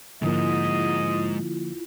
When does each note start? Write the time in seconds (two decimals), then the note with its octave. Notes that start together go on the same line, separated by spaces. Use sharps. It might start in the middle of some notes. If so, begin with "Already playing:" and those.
0.22 G#2 D3 F3 G#3 A#3 E4 F4 D#5